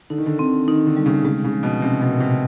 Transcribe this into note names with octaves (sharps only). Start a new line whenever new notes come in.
D3 D#4
D#3
D3
D3 C4
D#3 D#4
D3
G3
C#3
C#3 G#3
C#3
F3
B2
C3 C#4
B2
A#2
C3